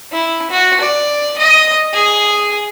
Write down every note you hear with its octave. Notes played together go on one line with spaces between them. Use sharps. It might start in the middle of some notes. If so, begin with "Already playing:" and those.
E4
F#4
D5
D#5
G#4